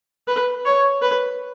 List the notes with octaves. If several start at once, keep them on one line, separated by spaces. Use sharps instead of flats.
B4
C#5
B4